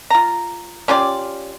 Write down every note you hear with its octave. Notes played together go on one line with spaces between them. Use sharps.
F4 A#5
C#4 F4 G4 D5